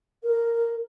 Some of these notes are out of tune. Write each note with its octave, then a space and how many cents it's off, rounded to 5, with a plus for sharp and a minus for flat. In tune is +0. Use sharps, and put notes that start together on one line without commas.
A#4 -5